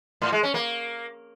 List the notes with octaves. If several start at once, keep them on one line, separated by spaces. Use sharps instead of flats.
A2
G#3
C#4
A#3